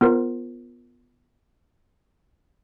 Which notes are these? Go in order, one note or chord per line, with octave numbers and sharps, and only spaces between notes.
B3 F4 A#4 C5